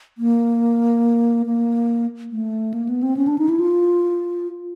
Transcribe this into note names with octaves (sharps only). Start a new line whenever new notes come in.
A#3
A#3
A3
A#3
B3
C4
C#4
D4
D#4
E4
F4